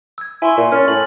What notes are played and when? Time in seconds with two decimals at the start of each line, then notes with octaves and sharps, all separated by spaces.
0.18 E6 G#6
0.42 E4 G#5 C6 C#6
0.58 A#2 G#5
0.72 C#4 F6 A6
0.88 A2 F#7